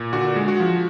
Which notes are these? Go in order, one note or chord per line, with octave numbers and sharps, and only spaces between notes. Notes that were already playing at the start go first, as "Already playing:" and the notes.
Already playing: A#2
D3 F#4
G#3
F#4
F3